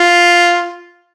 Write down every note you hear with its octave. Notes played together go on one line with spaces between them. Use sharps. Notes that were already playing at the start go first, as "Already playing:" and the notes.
Already playing: F4